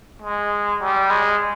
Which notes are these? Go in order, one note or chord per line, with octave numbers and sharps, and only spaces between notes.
G#3
G3
G#3